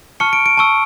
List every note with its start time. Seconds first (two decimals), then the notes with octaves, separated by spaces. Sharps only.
0.20 A5 C#6 F6 C#7
0.33 D7
0.46 D7
0.57 A5 C#6 E6